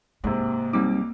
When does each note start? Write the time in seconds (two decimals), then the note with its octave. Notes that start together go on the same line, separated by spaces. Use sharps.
0.24 G#2 C3 A#3
0.73 B1 G3 C4 D#4 D6